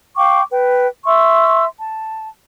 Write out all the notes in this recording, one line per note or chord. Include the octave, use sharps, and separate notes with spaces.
F5 G5 C#6 D6
B4 G5
E5 C6 C#6 E6
A5